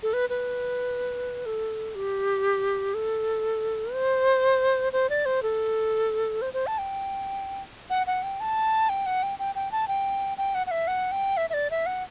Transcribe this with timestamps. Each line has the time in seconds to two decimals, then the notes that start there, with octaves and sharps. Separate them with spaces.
0.03 A4
0.13 B4
0.30 B4
1.46 A4
1.95 G4
2.94 A4
3.94 C5
4.93 C5
5.10 D5
5.26 C5
5.43 A4
6.42 C5
6.53 C5
6.67 A5
6.78 G5
7.90 F#5
8.07 F#5
8.23 G5
8.40 A5
8.89 G5
9.06 F#5
9.23 G5
9.39 G5
9.55 G5
9.72 A5
9.88 G5
10.38 G5
10.55 F#5
10.67 F#5
10.71 E5
10.88 F#5
11.12 G5
11.37 E5
11.50 E5
11.54 D5
11.71 E5
11.86 F#5